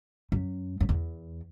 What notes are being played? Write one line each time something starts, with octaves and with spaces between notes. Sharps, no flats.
F#2
F#2
E2